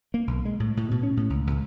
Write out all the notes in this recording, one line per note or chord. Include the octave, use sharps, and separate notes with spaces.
A#3
B1
G#3
A2
A2
B2
C#4
A2
C#2
C#2